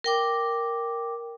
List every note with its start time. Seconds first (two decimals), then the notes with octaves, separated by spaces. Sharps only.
0.04 A#4 G5 D6